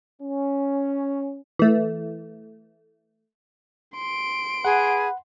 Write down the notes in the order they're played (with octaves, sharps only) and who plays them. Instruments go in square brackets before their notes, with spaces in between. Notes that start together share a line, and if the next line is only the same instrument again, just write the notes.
[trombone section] C#4
[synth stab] E3 A3
[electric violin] C6 D7
[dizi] G#4 [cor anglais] B4 [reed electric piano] F#5